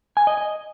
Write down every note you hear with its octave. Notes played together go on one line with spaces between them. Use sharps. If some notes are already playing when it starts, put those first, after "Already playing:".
G#5
D#5
D#5